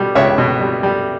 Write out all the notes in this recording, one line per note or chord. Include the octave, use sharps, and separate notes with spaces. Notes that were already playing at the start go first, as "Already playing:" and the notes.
Already playing: B2 G3
C#2 C#5 E5
B2
G3
G3